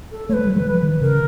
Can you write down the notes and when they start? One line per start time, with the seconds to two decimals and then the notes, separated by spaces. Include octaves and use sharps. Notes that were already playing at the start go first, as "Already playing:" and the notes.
0.12 A4
0.29 A3 B4 C#5
0.39 G#3
0.47 G3
0.56 F#3
0.60 E3
0.65 F3
0.83 D#3
1.01 C#3 A#4